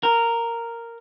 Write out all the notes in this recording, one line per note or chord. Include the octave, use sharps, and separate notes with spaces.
A#4